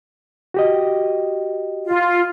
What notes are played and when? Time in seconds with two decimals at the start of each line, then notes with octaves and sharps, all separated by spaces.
0.54 F#4 G4 D#5
1.86 F4